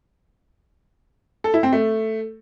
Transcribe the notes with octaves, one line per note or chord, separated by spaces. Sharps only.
A4
E4
C4
A3